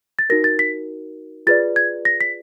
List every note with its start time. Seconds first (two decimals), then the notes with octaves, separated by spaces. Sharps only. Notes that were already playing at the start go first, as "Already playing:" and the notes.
0.19 A6
0.30 D#4 F#4 A#4 A#6
0.44 A6
0.59 B6
1.47 F4 G#4 B4 D5 A6
1.76 G#6
2.05 A#6
2.21 B6